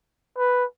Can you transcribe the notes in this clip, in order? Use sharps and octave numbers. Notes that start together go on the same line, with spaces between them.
B4